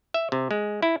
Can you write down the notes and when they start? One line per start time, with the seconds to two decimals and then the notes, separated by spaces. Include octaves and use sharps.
0.14 E5
0.32 C3
0.51 G#3
0.82 E4